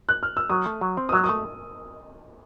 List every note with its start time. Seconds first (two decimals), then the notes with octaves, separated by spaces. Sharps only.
0.09 F#6
0.23 F6
0.37 E6
0.49 F#3 D#6
0.66 A3
0.81 F#3
0.97 C4
1.09 D#6
1.12 F#3 E6
1.24 D#6
1.29 A3